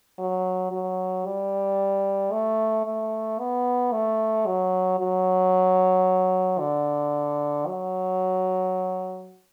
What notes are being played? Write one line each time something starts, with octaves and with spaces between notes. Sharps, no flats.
F#3
F#3
G3
A3
A3
B3
A3
F#3
F#3
D3
F#3